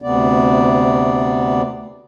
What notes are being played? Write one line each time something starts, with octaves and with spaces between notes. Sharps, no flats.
D2 C3 B3 D5